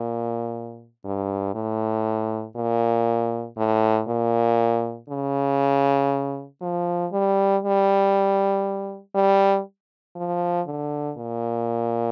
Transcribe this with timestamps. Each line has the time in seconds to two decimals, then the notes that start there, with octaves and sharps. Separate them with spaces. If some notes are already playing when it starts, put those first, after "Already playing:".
Already playing: A#2
1.04 G2
1.55 A2
2.56 A#2
3.57 A2
4.08 A#2
5.09 C#3
6.61 F3
7.12 G3
7.63 G3
9.15 G3
10.16 F3
10.67 D3
11.17 A#2